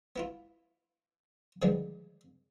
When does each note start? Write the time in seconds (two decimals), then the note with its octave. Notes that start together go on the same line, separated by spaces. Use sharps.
0.16 B3 E4 F4
1.62 D3 D#3 F3 G3 G#3 B3